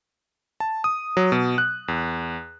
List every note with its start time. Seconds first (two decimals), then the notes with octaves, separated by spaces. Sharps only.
0.60 A5
0.84 D#6
1.17 F#3
1.32 B2
1.58 F#6
1.88 E2